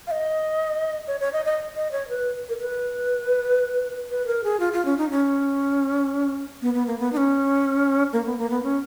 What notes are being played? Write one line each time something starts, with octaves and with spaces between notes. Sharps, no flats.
F5
D#5
C#5
C#5
D#5
D#5
D#5
C#5
B4
A#4
B4
B4
A#4
G#4
F4
F4
C#4
D#4
C#4
B3
B3
A#3
B3
D#4
C#4
A#3
B3
A#3
B3
C#4